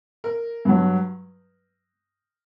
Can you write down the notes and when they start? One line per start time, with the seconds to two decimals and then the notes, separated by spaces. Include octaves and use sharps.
0.24 A#4
0.65 G2 F#3